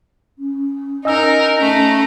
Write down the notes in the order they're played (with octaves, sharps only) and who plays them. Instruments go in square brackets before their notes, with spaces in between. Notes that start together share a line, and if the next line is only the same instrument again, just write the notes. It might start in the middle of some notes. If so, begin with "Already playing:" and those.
[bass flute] C#4
[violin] D#4 A#4 [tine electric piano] D#5 G#5 E6
[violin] A3 A#5 [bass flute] C#4